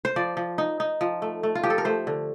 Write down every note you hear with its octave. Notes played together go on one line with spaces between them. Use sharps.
C5
F3 D5
F3
D#4
D#4
F3
A3
A3
F4
F3 G4
A4
A#4
A3 C5
D3